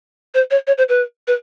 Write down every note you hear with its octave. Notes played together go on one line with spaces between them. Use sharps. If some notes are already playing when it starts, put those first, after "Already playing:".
C5
C#5
C#5
C5
B4
B4